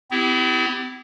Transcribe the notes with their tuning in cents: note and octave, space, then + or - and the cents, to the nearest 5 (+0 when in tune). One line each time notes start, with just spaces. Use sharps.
C4 -45 E4 +0 G4 +0